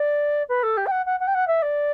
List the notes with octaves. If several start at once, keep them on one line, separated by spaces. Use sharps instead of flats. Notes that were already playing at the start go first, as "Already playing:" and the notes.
Already playing: D5
B4
A4
G4
G5
F#5
F#5
F#5
G5
F#5
E5
D5